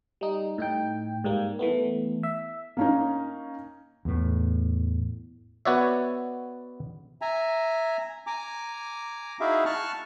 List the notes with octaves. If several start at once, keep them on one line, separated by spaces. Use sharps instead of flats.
G3 D#4
A2 D#4 G5
G#2 G3 A#3
E3 A3 B3
E5
A#3 C#4 D#4
E2 A2
B3 F#4 C#5 D5 E5
E5 G#5 A#5
G#5 A#5 D6
D#4 E4 F#4 G#4 E5 F5
A5 C#6 F6 F#6